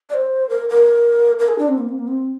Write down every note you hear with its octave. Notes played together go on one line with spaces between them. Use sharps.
D5
C5
A#4
A#4
A#4
G#4
D4
C4
A#3
C4
A#3
C4